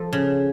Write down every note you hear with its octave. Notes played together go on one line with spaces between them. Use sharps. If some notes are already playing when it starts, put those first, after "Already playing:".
Already playing: F3 A4
C#3